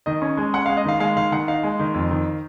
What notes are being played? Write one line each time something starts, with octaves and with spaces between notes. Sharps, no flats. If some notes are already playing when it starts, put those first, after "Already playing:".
D#3 D#5
C#4
G#3
C#4 F#5
G#3 F5
D#5
D#3 F5
G#3 F5
D#3 F5
D#3 F#5
D#4 F5
G#3
D#3
F2
D#3